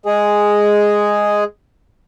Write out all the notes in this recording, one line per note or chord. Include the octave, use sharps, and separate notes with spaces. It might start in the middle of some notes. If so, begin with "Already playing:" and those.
G#3 G#4